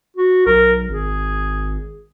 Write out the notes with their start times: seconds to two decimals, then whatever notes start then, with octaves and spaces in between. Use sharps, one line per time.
0.17 F#4
0.46 B1 A#4
0.88 G#1 G#4